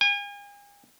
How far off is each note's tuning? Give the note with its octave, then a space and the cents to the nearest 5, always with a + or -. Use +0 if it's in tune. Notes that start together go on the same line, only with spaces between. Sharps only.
G#5 -40